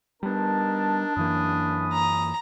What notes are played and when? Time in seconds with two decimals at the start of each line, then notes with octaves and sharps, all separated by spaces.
0.23 G3 B3 D4 D#4 A#4 A5
1.17 F#2 E3 A#3 C#4 B5 D#6
1.93 A#5